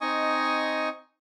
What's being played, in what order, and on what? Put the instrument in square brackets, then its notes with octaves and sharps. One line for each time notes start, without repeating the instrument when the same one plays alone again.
[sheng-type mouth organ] C4 D#4 D#5 G#5 C#6 D#6